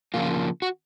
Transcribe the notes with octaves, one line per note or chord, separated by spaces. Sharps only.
C#3 F3 A#3 F4
F#4